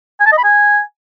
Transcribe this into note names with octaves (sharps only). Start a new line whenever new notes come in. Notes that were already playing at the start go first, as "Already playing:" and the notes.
G#5
A5
D#5
B5
G#5